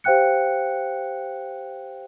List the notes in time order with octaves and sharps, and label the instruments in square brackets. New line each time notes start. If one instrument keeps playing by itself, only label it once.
[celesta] G4 C5 F5 G5 F#6 C#7